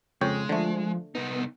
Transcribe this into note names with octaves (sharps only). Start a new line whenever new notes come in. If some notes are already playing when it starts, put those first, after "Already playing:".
F2 C#3 G#3 C#5 G5
D3 F3 A3
C2 B3 D#4